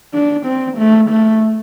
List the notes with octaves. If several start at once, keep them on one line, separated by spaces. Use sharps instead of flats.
D4
C4
A3
A3